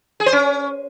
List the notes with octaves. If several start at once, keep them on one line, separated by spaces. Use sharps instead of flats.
G#4
C5
C#4